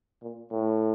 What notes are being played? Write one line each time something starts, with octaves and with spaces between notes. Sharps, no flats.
A#2
A2